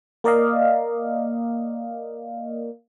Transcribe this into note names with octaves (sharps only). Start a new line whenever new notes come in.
A#3 A#4 D5 D#5 F5